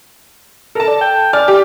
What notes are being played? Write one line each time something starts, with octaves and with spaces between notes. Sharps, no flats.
A4 A#4 A5
D5
G5
D5 G#5 F6
G4